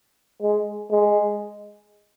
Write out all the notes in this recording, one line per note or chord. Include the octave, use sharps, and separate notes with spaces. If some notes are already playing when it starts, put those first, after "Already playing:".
G#3
G#3